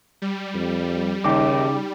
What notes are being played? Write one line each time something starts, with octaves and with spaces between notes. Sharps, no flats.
G3
F2
D#2 C#3 G5 D6